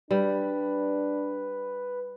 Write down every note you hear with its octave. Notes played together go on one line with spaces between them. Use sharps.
G3 D4 B4